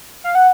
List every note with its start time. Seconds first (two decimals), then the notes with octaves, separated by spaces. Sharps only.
0.24 F5
0.35 F#5